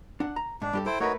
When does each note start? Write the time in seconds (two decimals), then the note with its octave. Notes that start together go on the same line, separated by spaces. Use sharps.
0.20 D4 F#5
0.36 A#5
0.62 G#2 D4
0.73 G2 G4 A4
0.86 E4 A4 C5 G5
1.00 A3 D#4 F#4 A#4 B4 C#5